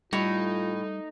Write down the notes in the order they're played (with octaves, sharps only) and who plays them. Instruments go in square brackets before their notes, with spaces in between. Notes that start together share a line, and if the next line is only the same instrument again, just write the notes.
[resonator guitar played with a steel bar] A2 [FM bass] G3 [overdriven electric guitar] D#4 [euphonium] F4